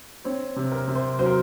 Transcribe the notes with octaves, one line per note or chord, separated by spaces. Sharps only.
C4 C#5
C3
A#4
C3
C5
F#3 C5
A#4